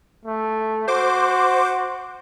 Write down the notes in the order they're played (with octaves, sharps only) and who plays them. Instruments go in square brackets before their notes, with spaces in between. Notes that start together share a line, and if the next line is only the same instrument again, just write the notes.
[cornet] A3
[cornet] F#4 [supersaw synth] C5 D6